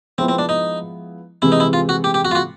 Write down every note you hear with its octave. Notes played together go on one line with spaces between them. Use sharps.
F3 G#3 B3 C4 E4
C4
D4
D#4
C3 E3 G#3 C4 E4
D#4
E4
F4
F#4
G4
G4
F#4
F4
F#4